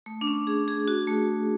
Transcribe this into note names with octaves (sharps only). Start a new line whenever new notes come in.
A3
D4
C#4
G#4
G#4
F#4
A3